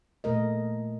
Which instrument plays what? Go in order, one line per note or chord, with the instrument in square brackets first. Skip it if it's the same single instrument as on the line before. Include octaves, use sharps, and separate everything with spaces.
[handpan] A#2 A3 A#4 D#5